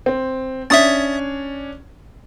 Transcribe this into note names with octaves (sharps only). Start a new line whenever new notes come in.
C4
C#4 D4 E5 D#6 A6